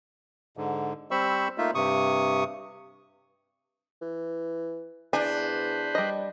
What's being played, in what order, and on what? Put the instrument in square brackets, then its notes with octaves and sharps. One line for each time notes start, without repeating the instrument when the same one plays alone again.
[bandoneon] G#2 D3
G3 C4 C5 B5 C#6 E6
A3 A#3 D#4 F4 E5
G2 C3 C#6 D#6
[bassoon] E3
[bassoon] E2 [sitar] D4 [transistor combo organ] B4 C5 [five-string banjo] G#5
[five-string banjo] G3 D#5